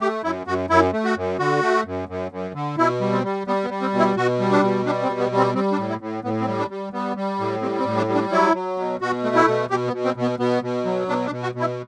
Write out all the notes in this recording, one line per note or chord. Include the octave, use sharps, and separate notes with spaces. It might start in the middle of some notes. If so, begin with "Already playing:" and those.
A3 G4
F#2 E4
F#2 F#4
F#2 E4
A3
F#4
F#2
D3 F#4
A3
F#2
F#2
F#2
D3
B2 E4
G3
C4
G3
G3 B3
B3
G3
C4
B2
E4
B2 F#4
G3
D4
B2
G3 D4
C4
B2
B3
G3
C4
G3 C4
D4
A2
E4
A2
A2 B3
C4
G3
D4
G3
G3 B3
G3
A2
G3 C4
C4
A2
D4
G3
D4
F#3 E4
F#3
B2
B2 F#4
A3
E4
B2
B2 G4
B3
B2
C4
B2
B3
B2 B3
B2
F#3
B2 D4
D4
B2
F#4
B2
E4